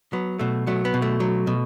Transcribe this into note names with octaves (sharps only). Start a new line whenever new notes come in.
F#3 B3
B2 A3
F#3 A3
B3
B2
A3
F#3
B2